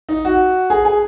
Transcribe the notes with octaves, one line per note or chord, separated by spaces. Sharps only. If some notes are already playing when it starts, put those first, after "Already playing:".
D#4
F#4
G#4
G#4